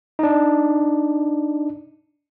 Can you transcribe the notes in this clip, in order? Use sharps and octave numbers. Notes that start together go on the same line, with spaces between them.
D4 D#4